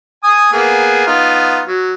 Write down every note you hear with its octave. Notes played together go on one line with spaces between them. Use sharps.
G#5 D#6
A#3 B3 G#4
B3 D#4 F4
F#3